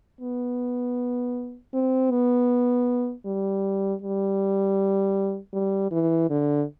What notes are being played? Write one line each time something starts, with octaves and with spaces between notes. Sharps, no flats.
B3
C4
B3
G3
G3
G3
E3
D3